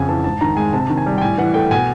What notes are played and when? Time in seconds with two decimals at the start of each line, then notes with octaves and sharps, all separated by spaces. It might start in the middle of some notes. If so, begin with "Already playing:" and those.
Already playing: F2 C#3 F#5 G#5
0.08 E3 A5
0.24 G#2 A5
0.41 D#3 A#5
0.57 G#3 G#5
0.73 C3 A5
0.90 D#3
0.97 G#5
1.06 G3
1.18 G5
1.22 A2 G#5
1.38 E3 F#5
1.54 A3 G5
1.71 B2 G#5